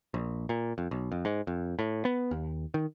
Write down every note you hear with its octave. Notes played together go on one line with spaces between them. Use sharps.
A#1
A#2
F2
B1
F2
G#2
F2
A2
B3
D#2
D#3